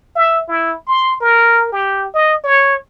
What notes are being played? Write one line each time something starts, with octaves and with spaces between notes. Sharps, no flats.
E5
E4
C6
A#4
G4
D#5
C#5